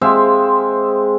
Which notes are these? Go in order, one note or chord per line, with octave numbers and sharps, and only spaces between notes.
G#3 C4 E5 F5